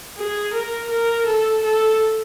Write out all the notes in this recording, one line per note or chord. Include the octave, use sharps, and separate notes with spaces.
G#4
A#4
A#4
A4
A4